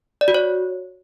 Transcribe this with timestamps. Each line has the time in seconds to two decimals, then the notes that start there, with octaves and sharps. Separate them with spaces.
0.21 D5
0.28 F#4
0.34 C#5